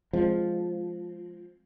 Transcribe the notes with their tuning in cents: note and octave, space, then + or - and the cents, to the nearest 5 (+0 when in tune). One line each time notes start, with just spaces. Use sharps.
F3 +0 G#3 +5 C4 +0